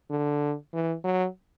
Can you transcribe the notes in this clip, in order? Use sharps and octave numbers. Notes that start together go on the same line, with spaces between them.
D3
E3
F#3